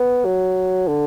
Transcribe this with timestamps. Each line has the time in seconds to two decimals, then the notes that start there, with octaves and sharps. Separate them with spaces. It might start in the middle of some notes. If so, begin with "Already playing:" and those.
Already playing: B3
0.25 F#3
0.88 D3